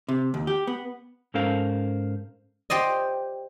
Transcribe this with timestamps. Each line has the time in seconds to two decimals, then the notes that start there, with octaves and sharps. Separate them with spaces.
0.08 C3
0.34 D#2
0.47 G4
0.67 B3
1.34 G#2 C#4 A4 A#4 C5 F5
2.70 G4 C5 D5 D#5